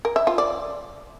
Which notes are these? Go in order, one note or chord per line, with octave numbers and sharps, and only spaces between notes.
A#4
E5
F4
D5